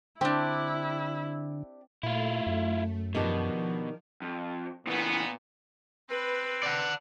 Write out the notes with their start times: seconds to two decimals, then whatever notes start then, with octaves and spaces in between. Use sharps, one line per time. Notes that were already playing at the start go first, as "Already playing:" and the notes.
0.21 D3 C4 D4 E4 G4 G5
2.03 A#2 A3 E4 F4
2.46 F#2
3.15 B2 D#3 F3 D4 G4
4.22 F2
4.87 A#2 C#3 E3 B3
6.10 C4 B4
6.63 D5 F#5